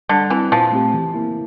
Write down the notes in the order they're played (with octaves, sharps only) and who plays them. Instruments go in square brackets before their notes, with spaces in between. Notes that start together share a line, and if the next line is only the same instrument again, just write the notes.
[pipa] D3 [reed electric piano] G3
[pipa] E3 [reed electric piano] C4 E4
[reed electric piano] A#2 [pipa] F3
[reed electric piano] A3 C4 G4
E3
A#3 E4